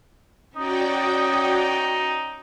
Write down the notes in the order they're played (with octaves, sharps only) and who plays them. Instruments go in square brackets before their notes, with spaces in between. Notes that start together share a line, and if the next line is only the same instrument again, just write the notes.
[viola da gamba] C#4 [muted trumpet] D#4 [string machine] F#4 D5 G5 [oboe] D#6